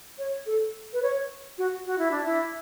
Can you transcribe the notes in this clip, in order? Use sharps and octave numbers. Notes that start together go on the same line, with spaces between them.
C#5
A4
B4
C#5
F#4
F#4
E4
D4
E4